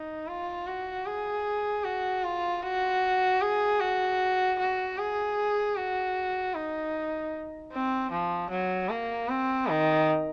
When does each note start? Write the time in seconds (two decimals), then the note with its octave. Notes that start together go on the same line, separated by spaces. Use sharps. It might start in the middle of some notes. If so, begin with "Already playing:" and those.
Already playing: D#4
0.27 F4
0.67 F#4
1.06 G#4
1.84 F#4
2.24 F4
2.62 F#4
3.41 G#4
3.80 F#4
4.59 F#4
4.98 G#4
5.76 F#4
6.54 D#4
7.72 C4
8.11 F3
8.50 F#3
8.89 A#3
9.28 C4
9.68 D#3